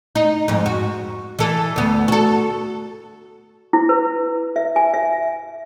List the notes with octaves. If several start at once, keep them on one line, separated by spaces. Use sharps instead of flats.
D#4
F2 G#2
F#4
E3 A4
D2 B3
F#4 A4
E4
B4
E5
G#5
E5